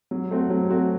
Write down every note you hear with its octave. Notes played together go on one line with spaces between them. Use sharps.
F#3
A3 C4 F#4
F#3
A3 C4 F#4